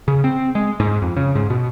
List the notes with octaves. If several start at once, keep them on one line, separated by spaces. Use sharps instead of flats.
C#3
C4
G#3
G#2
F2
C#3
G#2
B2